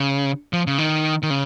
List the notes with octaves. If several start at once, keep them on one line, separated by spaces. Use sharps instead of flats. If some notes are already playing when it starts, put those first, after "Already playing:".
Already playing: C#3
F3
C#3
D#3
D#3
C#3